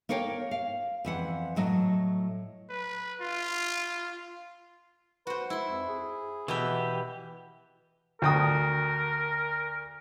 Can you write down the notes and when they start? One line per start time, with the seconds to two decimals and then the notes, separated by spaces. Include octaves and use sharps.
0.09 A#3 A#4 C#5 F5 G5
0.51 F5
1.05 F2 E3 F#5
1.56 A2 F#3 D#5
2.70 B4
3.21 F4
5.27 F#4 B4 C5
5.50 G#3 E4 C6
5.68 F2
5.89 G#4
6.48 B2 E3 G4 B4 E5
8.22 D2 A#4 G5 D#6